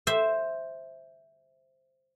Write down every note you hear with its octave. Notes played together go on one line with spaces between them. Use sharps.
C5 E5